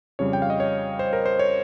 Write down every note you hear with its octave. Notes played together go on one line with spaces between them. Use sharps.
F2 C#3 G3 C#5
G5
F5
D#5
C#5
C5
A#4
C5
C#5